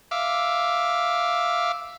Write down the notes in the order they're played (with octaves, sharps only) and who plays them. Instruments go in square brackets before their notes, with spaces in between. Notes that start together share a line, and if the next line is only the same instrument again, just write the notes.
[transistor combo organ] E5 F5 D6